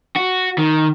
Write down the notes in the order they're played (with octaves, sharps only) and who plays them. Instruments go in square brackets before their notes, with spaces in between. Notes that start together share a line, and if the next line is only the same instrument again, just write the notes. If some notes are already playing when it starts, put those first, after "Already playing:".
[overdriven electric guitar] F#4
D#3